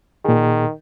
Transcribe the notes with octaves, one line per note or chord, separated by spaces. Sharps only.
A#2 D#3 G#4